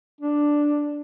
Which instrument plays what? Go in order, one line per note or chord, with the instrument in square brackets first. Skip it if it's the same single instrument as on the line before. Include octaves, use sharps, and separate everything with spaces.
[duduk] D4